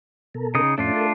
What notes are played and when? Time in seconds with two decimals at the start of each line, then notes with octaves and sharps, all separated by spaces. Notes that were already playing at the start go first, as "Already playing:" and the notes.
0.35 B2 A4 A#4
0.55 C#3 D#4 D#6
0.78 F2 A2 A3 C#4 D4 F4
0.96 A4 A#4